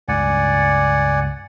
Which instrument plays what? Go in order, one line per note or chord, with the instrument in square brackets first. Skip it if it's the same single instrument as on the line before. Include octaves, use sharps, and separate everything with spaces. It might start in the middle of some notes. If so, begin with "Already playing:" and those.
[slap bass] C#2 G2 C#3 [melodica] D5 F#5 G#5